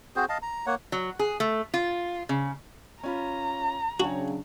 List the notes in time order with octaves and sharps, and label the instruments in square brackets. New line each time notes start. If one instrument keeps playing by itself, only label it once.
[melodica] C4 F#4 G#4 C5
D#5 F5 A5
A#5
A#3 C#5 F#5
[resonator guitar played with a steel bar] F#3
G#4
A3
F4
C#3
[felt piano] C#4 F4 B5 [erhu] A#5
[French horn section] C#3 F#3 D4 [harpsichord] F#4 [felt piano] C#5 G5 G#5